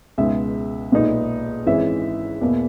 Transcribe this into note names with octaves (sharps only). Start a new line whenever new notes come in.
C#2 B2 G#3 D#4 E5
B1 A#2 G#3 B3 D#4
G#1 G#2 E3 G#3 C#4 E5
E2 B2 A#3